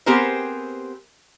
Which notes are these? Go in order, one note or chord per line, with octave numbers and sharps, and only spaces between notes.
B3 C4 G4 G#4 A#4 C5